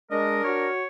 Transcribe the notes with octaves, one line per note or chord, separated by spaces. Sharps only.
G#3 D4 A#4 D#5
F#4 C#5